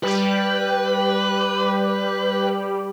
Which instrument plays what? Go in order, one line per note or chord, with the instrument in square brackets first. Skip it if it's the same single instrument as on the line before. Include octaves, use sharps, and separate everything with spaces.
[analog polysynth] G3 G4 [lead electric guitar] B4